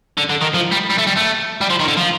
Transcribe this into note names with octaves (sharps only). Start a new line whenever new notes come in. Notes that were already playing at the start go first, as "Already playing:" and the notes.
D3
D3
D#3
F3
G3
G3
A3
G3
A3
G3
F3
D#3
D3
F3